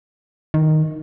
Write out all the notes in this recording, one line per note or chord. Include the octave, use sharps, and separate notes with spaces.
D#3